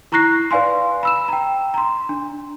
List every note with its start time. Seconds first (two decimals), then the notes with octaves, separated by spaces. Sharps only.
0.12 E4 A#5 C#6 F#6 A#6 C7
0.51 B4 D5 F5 G#5 C6
1.03 B5 E6 E7
1.28 G5 A#5
1.74 A#5 C6
2.09 D4